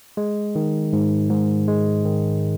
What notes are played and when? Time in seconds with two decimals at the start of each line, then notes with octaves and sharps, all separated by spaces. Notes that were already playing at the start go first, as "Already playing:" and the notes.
0.17 G#3
0.55 D#3
0.93 G#2
1.30 G#2
1.68 G#3
2.05 D#3